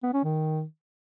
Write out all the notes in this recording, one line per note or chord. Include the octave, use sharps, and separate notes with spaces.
B3
C#4
D#3